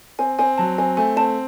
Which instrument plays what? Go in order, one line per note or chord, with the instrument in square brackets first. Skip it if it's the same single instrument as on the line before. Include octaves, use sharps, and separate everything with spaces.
[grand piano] C4 [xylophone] G#5
[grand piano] C4 [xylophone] G#5
[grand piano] F#3 [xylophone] A5
[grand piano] C4 [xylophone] G#5
[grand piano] A3 [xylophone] G#5
[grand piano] C4 [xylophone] A5